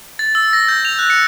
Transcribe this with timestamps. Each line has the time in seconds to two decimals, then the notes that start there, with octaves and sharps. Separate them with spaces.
0.19 A6
0.35 E6
0.53 A#6
0.68 G6
0.85 F7
0.99 F#6
1.10 C#7